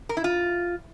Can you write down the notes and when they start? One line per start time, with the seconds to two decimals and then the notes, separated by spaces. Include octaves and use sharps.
0.09 A#4
0.17 E4
0.24 F4